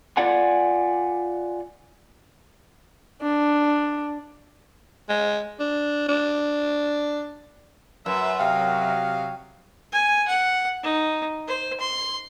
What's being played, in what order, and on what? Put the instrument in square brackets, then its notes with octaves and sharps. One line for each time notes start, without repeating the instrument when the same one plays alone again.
[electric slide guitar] F4 D5 F#5 G#5
[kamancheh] D4
[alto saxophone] G#3
D4
D4
[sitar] F#2 [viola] B4 E5
[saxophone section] C3 D#5 F5 [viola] F#3 [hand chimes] G5 F6
[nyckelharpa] G#5
F#5
D#4
C5
C6